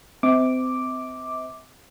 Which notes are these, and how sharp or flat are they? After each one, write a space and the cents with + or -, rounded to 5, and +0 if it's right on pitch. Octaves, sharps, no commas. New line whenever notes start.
C4 -30 E5 -45 D6 +0